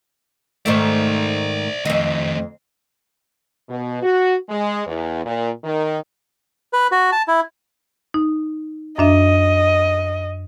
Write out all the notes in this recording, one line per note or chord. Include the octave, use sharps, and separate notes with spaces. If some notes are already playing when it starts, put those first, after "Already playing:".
G#2 D#3 A3 C5 D5
F2 D#3 A3 D#5
B2
F#4
G#3
E2
A#2
D#3
B4
F#4
A5
E4
D#4
F#2 D4 D#5 E5